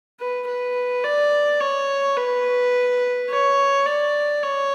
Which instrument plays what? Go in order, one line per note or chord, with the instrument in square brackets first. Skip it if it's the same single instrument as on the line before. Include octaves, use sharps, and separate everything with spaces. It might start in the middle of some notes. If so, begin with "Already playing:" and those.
[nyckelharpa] B4
B4
D5
C#5
B4
C#5
D5
C#5